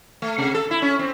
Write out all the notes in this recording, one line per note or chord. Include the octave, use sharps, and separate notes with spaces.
A3
C3
A4
E4
C#4
C4